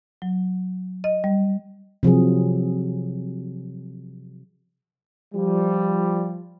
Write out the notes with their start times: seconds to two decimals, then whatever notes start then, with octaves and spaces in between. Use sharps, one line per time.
0.22 F#3
1.04 D#5
1.24 G3
2.03 C3 F3 F#3 G#4
5.34 F3 G3